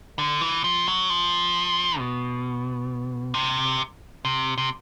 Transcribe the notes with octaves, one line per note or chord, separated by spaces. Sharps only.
D3
E3
F3
F#3
F3
B2
C3
C3
C3